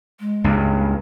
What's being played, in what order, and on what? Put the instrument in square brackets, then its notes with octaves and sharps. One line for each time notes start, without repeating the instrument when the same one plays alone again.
[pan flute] G#3
[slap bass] C#2 G2